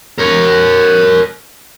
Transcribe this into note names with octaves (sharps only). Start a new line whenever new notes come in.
A#4 C#5